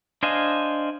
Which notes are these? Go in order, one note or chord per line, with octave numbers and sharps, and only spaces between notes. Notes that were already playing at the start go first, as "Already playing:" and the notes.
D4 C5 D#5 F5 G#5